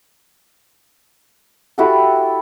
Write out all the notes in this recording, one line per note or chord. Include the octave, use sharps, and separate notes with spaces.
E4 F#4 G4 A4